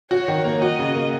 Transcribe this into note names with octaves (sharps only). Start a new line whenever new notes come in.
F#4 C#5
D#3
A#3
F#4 D#5
C#3
A#3